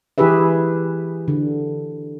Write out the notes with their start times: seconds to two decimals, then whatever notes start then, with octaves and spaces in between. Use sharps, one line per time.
0.18 E3 E4 G4 G#4 B4 E5
1.28 D3